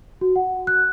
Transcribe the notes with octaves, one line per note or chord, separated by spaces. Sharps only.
F#4
F#5
F#6